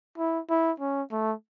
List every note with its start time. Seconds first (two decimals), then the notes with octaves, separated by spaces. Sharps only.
0.18 E4
0.49 E4
0.80 C#4
1.11 A3